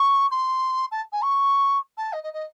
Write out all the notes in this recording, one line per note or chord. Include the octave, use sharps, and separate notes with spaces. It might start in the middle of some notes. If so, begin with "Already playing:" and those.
Already playing: C#6
C6
A5
G#5
C#6
A5
D#5
D#5
D#5